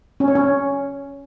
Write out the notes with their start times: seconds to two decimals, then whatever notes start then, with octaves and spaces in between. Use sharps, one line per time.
0.20 C#4
0.28 C#5
0.35 C#4